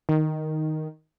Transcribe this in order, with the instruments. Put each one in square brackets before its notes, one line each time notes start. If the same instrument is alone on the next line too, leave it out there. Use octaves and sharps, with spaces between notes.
[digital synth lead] D#3